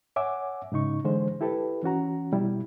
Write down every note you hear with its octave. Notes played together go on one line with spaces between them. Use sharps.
C#5 E5 F#5 G#5 D6
G#2 C#3 D#4 C#6
D3 E3 G#3 C5
E4 G4 A4 B4
E3 C#4 F#4 A#5
B2 G3 E4